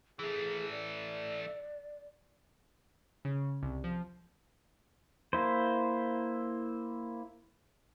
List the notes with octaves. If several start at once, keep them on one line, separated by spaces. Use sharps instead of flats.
E3 A3 G#4
D5
C#3
C2
F3
A#3 E4 C5